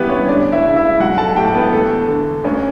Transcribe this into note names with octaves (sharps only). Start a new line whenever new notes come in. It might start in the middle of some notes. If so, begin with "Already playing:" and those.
Already playing: A1 G2 E3 G3 B3 E4 G4 B4
C#4 C#5
D2 D4 D5
E4 E5
C#3
E4 E5
B1 F#4 F#5
A4 A5
A2 G4 G5
B3 B4
E2 A3 A4
D3
D2 C#4